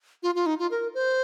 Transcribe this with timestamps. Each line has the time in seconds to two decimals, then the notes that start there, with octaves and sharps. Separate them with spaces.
0.23 F4
0.35 F4
0.46 D#4
0.59 F4
0.71 A#4
0.94 C5